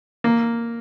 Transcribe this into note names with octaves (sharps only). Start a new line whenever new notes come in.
A#3